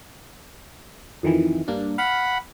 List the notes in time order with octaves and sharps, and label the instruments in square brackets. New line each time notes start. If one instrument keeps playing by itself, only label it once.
[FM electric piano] F2 D#3 E3
G2 A#3 D4
[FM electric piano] F5 [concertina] F#5 B5